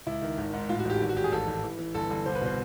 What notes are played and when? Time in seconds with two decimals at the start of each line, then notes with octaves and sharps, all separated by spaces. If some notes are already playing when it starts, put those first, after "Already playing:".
0.06 C#2 E4
0.22 D#3
0.38 G#1
0.53 G#2
0.69 A2 F4
0.79 F#4
0.85 A1 G4
1.01 G#1
1.09 F#4
1.16 G#1 G4
1.24 G#4
1.32 A1 A4
1.48 A1
1.64 E3
1.79 E3
1.95 G1 A4
2.10 G1
2.26 C2 C5
2.35 B4
2.42 B2 C5